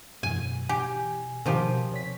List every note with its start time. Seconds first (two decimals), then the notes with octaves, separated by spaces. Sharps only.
0.23 F#2 B2 E3 G#5
0.69 G4 G#5
1.46 B2 D#3 F3 G4
1.92 C3 C#5 B6